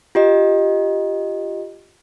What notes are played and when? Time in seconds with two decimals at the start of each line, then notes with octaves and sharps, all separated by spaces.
0.15 F4 G4 D#5